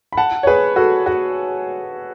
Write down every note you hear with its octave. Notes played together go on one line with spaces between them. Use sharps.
B5
F#5 A5
C#5
G#4 B4
F#4 A4
F#4